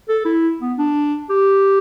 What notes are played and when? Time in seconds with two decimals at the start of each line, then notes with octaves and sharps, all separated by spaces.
0.09 A4
0.25 E4
0.61 B3
0.78 D4
1.30 G4